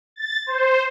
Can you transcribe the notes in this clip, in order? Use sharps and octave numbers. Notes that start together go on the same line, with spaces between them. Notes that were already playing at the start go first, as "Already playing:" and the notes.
A6
C5